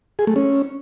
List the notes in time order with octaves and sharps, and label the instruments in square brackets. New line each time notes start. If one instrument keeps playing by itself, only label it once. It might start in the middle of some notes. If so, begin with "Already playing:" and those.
[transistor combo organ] G#4
A3
C#4